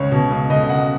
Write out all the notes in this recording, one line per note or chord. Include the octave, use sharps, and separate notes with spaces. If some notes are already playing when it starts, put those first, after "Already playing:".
Already playing: C#2 C#5
B2
C#2
C#2 D#5
D#5
C#2 F#5